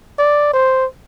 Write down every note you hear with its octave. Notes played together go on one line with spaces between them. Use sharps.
D5
C5